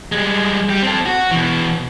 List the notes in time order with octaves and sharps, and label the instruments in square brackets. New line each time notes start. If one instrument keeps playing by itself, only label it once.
[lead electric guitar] G3 G#3
G3
C4 A4
F#4
B2 E3